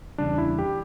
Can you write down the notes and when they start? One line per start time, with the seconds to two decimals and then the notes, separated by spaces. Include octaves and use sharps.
0.18 E2 C#3 G3 D4
0.38 E4
0.58 G4